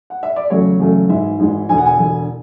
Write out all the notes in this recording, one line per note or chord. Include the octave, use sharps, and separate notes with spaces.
F#5
E5
D5
E2 C#3 F#3 A3 C#5
E2 C#3 F#3 A3
G#1 G#2 E3 G#3 E5
G#1 G#2 E3 G#3
E1 E2 D3 G#5
F#5
G#5
E1 E2 D3